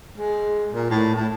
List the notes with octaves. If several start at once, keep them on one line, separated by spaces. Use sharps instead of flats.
G#3
A#2
A2
A2